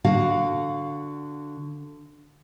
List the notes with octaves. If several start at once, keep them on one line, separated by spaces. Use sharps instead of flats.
D3 F#4 F5